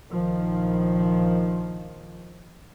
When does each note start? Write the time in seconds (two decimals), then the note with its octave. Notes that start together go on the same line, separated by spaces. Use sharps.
0.10 A#1 D#3 F3